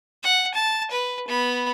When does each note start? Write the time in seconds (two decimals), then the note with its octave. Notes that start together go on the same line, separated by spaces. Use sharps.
0.23 F#5
0.54 A5
0.91 B4
1.28 B3 B5